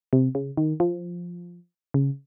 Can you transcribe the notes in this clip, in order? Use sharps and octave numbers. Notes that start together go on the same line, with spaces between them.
C3
C#3
D#3
F3
C#3